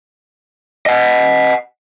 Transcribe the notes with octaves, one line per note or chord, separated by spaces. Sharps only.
D#5 F#5